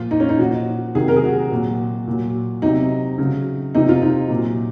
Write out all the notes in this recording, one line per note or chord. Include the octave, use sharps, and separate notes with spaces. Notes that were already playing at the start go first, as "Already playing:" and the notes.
Already playing: A#2 F3 F4
D#4
C#4
D#4
A#2 F3 F#4
C3 D#3 F#3 G#4
A#4
G#4
F#4
A#2 F#3
A#2 F#3
C3 F#3 D#4
C#3 F#3
C3 F3 D#4
F4
D#4
A#2 F#3